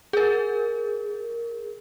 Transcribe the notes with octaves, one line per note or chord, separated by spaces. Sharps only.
G#4 A#4